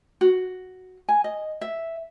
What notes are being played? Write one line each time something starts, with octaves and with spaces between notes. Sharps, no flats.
F#4
G#5
D#5
E5